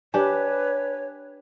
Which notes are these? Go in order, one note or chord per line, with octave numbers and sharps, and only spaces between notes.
D4 G4 B4 C#5 D5 G#5